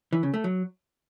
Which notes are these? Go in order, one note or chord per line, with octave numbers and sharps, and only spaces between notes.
E3
C#3
A3
F#3